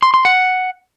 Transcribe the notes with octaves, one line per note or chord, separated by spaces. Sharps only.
C6
C6
F#5